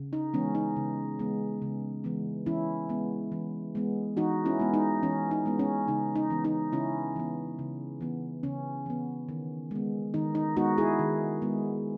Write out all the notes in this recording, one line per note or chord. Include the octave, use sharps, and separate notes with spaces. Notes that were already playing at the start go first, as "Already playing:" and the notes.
Already playing: C#3
D#4
E3 G#3 B3 C#4
D#4
C#3
E3 G#3 B3
C#3
E3 G#3 B3
E3 C#4 E4
G#3 B3
E3
G#3 B3
E3 D#4 F#4
C#4 E4
G#3 B3
D#4
E3 C#4
D#4
G#3 B3
C#4
C#3 D#4
D#4
E3 B3
D#4
C#3 C#4 E4
E3 B3
C#3
E3 B3
C#3 C#4
E3 B3
D#3
G#3 B3
D#3 D#4
D#4
G#3 B3 D#4 F#4
E4 G#4
D#3
G#3 B3